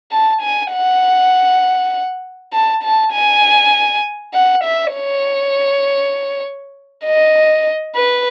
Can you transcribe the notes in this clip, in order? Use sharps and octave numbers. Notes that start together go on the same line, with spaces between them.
A5
G#5
F#5
A5
A5
G#5
F#5
E5
C#5
D#5
B4